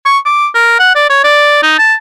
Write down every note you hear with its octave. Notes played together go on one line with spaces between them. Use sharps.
C#6
D6
A#4
F#5
D5
C#5
D5
D#4
A5